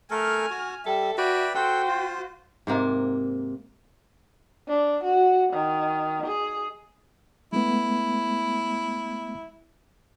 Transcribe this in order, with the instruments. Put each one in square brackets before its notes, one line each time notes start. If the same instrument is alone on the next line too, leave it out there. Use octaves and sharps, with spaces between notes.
[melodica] A3 A4 A#4 [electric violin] G#5 F6
[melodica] F#4
[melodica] G3 [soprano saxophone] A4 [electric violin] E5
[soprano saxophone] F#4 [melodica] B4 D5 G5 [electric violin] E5
[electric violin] F#4 C5 [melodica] A4 F#5 [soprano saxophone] G5
[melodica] F4
[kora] G#2 C3 A#3
[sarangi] D4
F#4
D#3
G#4
[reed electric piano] G#3 A3 B3 [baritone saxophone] E4